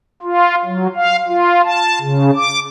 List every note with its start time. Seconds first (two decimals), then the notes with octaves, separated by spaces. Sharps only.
0.22 F4
0.65 F#3
0.96 F5
1.27 F4
1.64 A5
2.01 C#3
2.36 D6